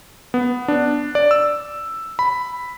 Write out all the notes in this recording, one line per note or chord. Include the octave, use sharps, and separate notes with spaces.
B3
D4
D5
E6
B5